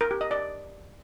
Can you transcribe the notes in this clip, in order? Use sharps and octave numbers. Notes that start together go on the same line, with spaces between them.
A#4
G4
D#5
D5